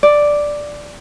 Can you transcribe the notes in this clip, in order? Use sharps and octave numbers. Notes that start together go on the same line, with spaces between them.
D5